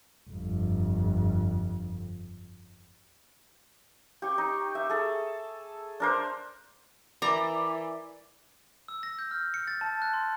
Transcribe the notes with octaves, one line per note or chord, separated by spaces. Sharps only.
G1 F2
G4 C#6
D#4
E5
G#4 A4
D4 A#4 C5
E3 A#4 D5 A#5 B5 D6
E6
A#6
G6
F6
C#7
A6
A5
F#6
C6